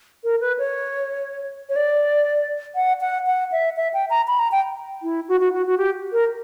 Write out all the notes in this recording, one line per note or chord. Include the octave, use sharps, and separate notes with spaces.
A#4
B4
C#5
C#5
D5
F#5
F#5
F#5
E5
E5
G5
A#5
B5
A#5
G5
E4
F#4
F#4
F#4
F#4
G4
A#4